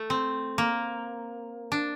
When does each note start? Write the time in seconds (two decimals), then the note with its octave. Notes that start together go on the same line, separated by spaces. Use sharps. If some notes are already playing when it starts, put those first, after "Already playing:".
Already playing: A3
0.10 C4
0.58 A#3
1.72 D4